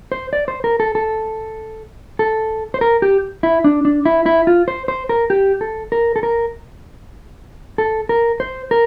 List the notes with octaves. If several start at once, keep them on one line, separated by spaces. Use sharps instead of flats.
C5
D5
C5
A#4
A4
A4
A4
C5
A#4
G4
E4
D4
D4
E4
E4
F4
C5
C5
A#4
G4
A4
A#4
A4
A#4
A4
A#4
C5
A#4